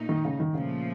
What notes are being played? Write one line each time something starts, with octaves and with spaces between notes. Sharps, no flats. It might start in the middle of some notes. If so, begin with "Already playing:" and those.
Already playing: A#2 A3 D#4
D#3
C#3
D#3
A#2 C#3 F3 A3